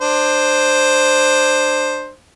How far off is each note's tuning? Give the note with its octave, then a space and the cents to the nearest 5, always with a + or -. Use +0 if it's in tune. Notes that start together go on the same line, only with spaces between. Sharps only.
D4 +20 C5 +5